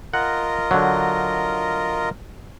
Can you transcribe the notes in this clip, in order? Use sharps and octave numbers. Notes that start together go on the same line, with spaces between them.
F4 A#4 D#5 F#5
D3 F#3